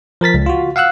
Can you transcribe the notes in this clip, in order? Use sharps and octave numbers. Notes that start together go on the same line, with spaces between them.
F3 A#4 A6 B6
C#2
F4 F#4
F5 F#5 E6 F#6